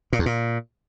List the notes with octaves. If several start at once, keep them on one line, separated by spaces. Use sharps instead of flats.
A#2
E2
A#2